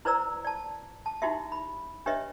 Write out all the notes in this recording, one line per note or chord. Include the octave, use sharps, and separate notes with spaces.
E4 B4 C5 D5 A#5 E6
D5 A5
A5
D#4 E4 F#4 G4 E5
B5
D4 G4 B4 C#5 D#5 E5